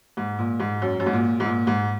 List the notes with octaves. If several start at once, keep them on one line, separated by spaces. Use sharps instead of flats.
G#2
A#2
G#2
F#2
F#2
G#2
A#2
G#2
A#2
G#2